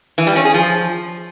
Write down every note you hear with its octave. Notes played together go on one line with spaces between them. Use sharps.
E3
G3
C#4
G#4
F3